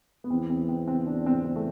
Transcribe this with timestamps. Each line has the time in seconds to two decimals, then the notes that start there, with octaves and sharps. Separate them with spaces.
0.24 B3
0.30 E2 C4
0.50 C4
0.69 C4
0.88 C4
1.06 D4
1.26 C4
1.45 C4
1.56 A3